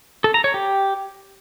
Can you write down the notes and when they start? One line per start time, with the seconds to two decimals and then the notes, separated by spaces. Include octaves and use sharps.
0.24 A4
0.34 A#5
0.44 C#5
0.54 G4